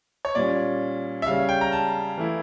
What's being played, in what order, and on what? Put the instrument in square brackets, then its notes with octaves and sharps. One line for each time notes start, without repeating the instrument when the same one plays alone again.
[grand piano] C#5
[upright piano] A#2 G3 C#4 [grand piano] D5
[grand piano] E5
[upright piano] C#3 G3 C#4 [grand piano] F5
[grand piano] G5
A#5
A5
[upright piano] E3 A3 E4